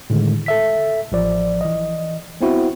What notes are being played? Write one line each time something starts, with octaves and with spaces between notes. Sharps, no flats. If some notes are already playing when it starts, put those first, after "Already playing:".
A2 D3 D#3 G#3
A4 E5 B6
A1 F3 D5
E3 D#5
B3 C4 E4 F#4